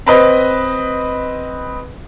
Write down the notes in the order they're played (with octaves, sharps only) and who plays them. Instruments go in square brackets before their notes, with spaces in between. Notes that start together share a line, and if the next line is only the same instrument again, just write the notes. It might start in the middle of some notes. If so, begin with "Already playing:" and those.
[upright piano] C4 B4 D#5